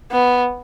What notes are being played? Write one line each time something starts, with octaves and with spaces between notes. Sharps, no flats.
B3